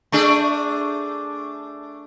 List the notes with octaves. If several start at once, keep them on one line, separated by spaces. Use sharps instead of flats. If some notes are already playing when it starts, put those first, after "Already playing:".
A3 D4 G#4